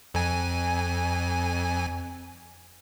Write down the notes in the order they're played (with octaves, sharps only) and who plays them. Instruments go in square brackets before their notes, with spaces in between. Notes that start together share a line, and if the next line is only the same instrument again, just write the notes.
[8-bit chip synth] F2 G#5